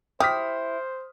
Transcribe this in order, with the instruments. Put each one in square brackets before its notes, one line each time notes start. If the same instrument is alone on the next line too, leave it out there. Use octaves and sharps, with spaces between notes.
[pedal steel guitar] E4 [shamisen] G4 [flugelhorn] C5 [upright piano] D#6 F6 B6